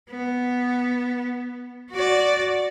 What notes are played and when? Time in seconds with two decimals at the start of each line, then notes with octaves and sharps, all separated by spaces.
0.10 B3
1.91 F#4 D5